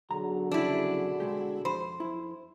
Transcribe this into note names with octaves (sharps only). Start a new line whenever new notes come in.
B1 D3 F#4 G#4 A#5
B1 F2 C#3 D4 E4
B2 G#3 G4
F2 C5 B5
F2 E4